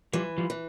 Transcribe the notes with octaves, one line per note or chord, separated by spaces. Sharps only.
E3 F3 G3
F3 G3
E3